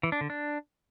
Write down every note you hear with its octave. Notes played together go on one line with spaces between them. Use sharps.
E3
D4
D3
D4